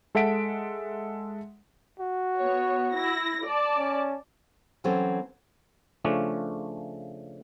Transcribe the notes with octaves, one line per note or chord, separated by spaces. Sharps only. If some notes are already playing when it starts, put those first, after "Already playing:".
G#3 A4 E5 F#5 B6 D7
F#4
B3 C#5
E4 A#6
D5 A5
C#4
E3 F#3 C4 C#4 A4 C5
C#3 F3 A3 C#4 D4